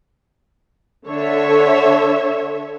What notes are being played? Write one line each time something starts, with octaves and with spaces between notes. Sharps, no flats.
D3 C#5 E5